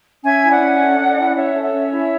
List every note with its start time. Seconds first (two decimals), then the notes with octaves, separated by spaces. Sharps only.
0.24 C#4 E5 G#5
0.42 E4
0.51 D5 F#5
0.61 C#4
0.80 A4
0.99 C#4
1.17 E4
1.35 C#4 C#5 E5
1.54 A4
1.63 C#5 E5
1.72 C#4
1.91 E4